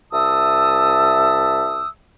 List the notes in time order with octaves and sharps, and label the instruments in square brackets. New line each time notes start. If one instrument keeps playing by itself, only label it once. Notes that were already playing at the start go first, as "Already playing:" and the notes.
[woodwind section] C2 E5 A5 D#6 E6